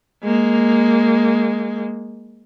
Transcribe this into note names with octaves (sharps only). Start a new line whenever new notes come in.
G#3 A#3